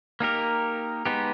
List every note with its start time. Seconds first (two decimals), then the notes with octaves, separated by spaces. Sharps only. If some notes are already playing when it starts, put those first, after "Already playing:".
0.20 A#3 D#4 G4 A#4
1.06 G#3 B3 D#4 G4